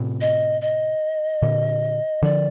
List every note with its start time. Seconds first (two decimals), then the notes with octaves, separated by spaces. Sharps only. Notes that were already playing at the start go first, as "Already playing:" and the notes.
Already playing: A2 C3
0.21 D#5
0.61 D#5
1.42 A#2 D3
2.22 D3 F3 D5